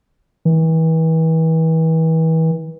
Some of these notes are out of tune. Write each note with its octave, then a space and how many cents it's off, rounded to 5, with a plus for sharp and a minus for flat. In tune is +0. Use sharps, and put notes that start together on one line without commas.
E3 -35